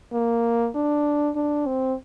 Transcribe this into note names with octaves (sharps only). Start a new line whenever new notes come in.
A#3
D4
D4
C4